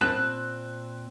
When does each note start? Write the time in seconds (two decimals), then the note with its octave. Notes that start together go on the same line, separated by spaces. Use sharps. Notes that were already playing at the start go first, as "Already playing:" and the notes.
0.01 A#2 C4 A5 B5 F#6